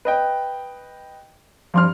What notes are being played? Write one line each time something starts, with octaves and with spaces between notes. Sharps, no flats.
B4 D#5 G5
G2 F3 C6 F6